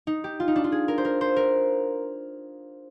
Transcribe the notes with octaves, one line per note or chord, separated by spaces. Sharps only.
D#4
G4
F4
D#4
D4
F4
G#4
A#4
C5
A#4
C5
A#4